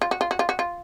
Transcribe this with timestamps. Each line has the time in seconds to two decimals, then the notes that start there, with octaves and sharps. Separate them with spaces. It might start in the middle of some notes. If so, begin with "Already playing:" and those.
0.02 F4
0.11 F#4
0.21 F4
0.31 F#4
0.39 F4
0.49 F#4
0.59 F4